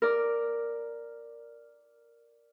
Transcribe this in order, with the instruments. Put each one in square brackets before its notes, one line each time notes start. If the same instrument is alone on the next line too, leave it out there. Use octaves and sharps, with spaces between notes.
[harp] A#4 D5